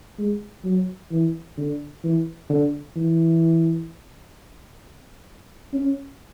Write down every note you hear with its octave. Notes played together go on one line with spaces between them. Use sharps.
G#3
F#3
E3
D3
E3
D3
E3
C#4